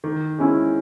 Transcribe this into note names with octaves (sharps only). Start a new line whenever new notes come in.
D#3
G#3 C#4 E4